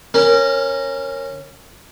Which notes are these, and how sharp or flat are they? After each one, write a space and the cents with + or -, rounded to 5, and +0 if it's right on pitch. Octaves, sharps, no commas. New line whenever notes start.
C#4 -15 A#4 +0